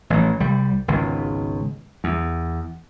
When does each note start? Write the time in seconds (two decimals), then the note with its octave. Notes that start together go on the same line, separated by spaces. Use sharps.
0.10 A1 E3
0.40 C2 G3
0.88 G#1 C#2 B2
2.04 E2